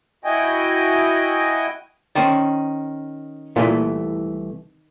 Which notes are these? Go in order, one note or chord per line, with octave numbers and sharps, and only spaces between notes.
E4 F#4 D#5 G5 G#5
D#3 C#4 C5 D5
C2 A#2 E3 A3